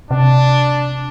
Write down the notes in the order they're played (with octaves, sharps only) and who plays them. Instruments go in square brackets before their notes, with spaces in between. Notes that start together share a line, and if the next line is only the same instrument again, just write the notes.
[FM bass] C3 [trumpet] D4